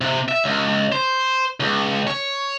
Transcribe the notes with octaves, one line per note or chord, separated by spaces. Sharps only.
C3
E5
C#2
C5
C#2
C#5